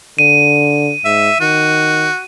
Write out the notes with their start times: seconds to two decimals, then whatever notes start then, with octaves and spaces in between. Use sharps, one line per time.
0.19 D3 D#7
1.05 G#2 E5
1.40 D#3 F#4